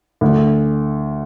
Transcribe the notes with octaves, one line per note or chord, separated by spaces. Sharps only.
D2